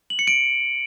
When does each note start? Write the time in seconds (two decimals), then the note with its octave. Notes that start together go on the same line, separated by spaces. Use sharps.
0.10 F#7
0.19 C#7
0.27 D7